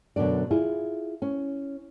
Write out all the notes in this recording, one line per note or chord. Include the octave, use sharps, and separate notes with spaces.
F#2 B2 D3 D4 D5
E4 F4 G#4
C#4